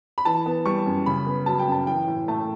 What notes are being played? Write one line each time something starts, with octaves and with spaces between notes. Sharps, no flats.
B5
E3 A5
B3
G3 C#6
F#2
C#3 B5
B3
F#3 A5
G5
F#2 A5
E3 G5
A2
A3 A5